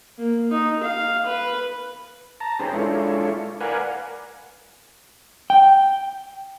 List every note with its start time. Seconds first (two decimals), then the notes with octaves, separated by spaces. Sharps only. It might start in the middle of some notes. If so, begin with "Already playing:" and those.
0.18 A#3
0.51 D#4
0.83 F5
1.26 B4
2.40 A5 A#5
2.59 C#4 D#4 G4 G#4 B4 C5
2.73 G#3 D4 E4 F4 A4 C#5
3.60 A#4 B4 D5 F5 F#5 G#5
5.50 G5